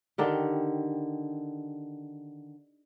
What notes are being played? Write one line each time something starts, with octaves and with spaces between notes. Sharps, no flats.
D3 D#3 G4